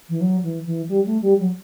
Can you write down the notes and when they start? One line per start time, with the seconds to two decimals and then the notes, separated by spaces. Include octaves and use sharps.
0.09 E3
0.21 F#3
0.43 E3
0.66 E3
0.88 G3
1.06 A3
1.22 G3
1.39 F#3